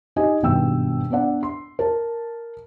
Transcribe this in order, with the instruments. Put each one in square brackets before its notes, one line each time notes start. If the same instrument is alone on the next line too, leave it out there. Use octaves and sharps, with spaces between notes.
[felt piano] D#4 G4 D#5 G#5
G#1 G2 B2 G5 E6
B3 D4 D5 F#5
C6
A#4 A5